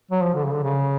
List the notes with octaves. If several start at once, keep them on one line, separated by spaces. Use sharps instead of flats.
F#3
F3
D3
C#3
D3
C#3